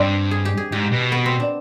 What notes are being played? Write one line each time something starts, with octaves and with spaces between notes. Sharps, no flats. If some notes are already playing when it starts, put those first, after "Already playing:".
Already playing: G2 C4 D4
G#4
G4
G#4
G#2 G4
B2
B3
C4
D4